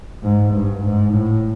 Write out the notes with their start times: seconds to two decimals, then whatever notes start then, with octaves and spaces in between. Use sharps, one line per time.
0.23 G#2
0.54 G2
0.84 G#2
1.14 A2